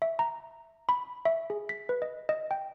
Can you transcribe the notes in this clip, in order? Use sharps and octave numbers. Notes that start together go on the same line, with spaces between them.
E5
A#5
B5
E5
G#4
B6
B4
D#5
D#5
G5